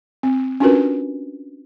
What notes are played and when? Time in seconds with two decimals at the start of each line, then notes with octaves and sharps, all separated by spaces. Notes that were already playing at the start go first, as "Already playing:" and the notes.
0.23 C4
0.60 C#4 D4 F4 F#4 A#4 B4